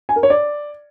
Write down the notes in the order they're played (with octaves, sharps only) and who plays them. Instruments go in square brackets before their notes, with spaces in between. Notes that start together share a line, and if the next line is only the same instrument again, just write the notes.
[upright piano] G#5
A#4
C#5
D5